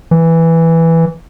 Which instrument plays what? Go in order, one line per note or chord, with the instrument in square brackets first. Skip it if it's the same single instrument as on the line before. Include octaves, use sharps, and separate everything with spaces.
[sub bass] E3